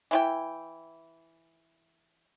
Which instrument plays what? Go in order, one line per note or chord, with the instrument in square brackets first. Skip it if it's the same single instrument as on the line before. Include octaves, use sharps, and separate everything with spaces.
[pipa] E3 E4 G5